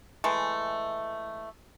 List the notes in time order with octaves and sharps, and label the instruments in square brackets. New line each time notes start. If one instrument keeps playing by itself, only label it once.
[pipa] E3 G#3 A3